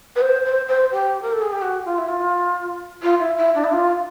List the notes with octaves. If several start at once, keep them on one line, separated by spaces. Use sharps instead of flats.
B4
C5
C5
C5
G4
A#4
A4
G#4
G4
F#4
F4
E4
F4
F4
E4
E4
D4
E4
F4